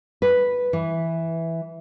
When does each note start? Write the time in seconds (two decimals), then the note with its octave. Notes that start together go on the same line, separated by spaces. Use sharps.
0.22 B4
0.73 E3